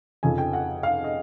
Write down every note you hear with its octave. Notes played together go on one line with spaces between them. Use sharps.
F2 C#3 F3 G#5
G5
F#5
F5
D#5